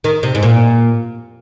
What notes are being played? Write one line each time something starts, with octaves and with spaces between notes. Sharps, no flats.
D#3
C3
G#2
A#2